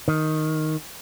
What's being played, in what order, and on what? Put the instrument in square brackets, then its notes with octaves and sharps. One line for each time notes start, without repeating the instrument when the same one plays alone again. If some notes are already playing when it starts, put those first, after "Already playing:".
[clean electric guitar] D#3